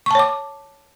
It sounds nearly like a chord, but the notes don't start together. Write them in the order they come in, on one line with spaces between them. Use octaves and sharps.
C#6 A5 C#5 D6